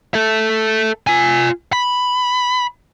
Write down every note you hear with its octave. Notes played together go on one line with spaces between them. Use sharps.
A4 E5
F4 G#5
B5